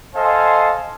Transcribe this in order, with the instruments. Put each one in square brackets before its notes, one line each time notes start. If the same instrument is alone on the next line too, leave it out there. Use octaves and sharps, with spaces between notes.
[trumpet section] A4 C5 D#5 F5 G#5